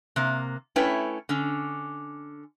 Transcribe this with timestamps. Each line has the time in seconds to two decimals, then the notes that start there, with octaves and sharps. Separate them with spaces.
0.16 C3 A#3
0.76 A3 C#4 E4 B4 C#5 G5
1.29 D3 C#4